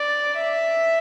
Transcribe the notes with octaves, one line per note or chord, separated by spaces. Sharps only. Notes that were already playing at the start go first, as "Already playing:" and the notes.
Already playing: D5
E5